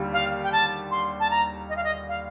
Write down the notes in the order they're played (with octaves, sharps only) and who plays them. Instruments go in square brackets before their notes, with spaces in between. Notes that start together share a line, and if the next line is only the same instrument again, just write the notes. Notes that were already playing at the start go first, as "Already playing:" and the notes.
Already playing: [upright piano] D#2 D3 G3
[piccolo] F5
G5
A5
C6
A5
A#5
D#5
F5
D#5
F5